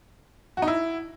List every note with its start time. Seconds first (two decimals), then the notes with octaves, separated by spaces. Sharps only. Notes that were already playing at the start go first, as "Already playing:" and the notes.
0.57 F#4
0.62 D#4
0.68 E4